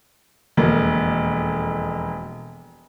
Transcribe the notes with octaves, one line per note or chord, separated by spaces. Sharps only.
E1 F2 A#3